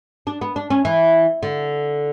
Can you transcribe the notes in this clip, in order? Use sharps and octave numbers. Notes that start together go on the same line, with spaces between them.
D4
B3
D4
C#4
E3
D3